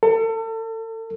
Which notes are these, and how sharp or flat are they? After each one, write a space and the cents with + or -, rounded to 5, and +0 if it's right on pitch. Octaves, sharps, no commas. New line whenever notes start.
A4 +35